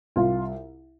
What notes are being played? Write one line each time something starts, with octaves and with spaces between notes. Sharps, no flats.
C2 F4 F5